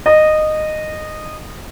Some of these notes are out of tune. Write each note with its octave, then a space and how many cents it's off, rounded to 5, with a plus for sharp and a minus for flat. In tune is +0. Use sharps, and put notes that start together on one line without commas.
D#5 -15